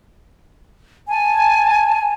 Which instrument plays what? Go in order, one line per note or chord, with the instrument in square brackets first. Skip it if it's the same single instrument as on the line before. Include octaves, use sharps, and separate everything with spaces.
[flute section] G#5 A5